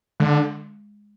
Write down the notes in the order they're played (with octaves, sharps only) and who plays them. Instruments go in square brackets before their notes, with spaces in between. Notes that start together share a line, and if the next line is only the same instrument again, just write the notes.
[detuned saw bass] D3 [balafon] G#3